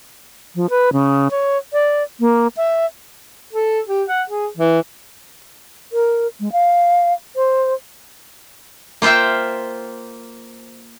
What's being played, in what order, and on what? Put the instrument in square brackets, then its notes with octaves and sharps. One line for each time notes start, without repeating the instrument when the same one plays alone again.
[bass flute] F3
B4
C#3
C#5
D5
A#3
E5
[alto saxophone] A4
G4
F#5
G#4
E3
[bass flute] A#4
G#3
F5
C5
[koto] A#3 F4 C5 E5 G5